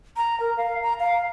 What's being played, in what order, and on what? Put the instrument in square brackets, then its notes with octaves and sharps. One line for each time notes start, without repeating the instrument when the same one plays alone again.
[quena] A#5
A#4
F5
A#5
F5